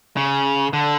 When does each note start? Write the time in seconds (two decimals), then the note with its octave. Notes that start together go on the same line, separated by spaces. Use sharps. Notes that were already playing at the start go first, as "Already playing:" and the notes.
0.17 C#3
0.73 D3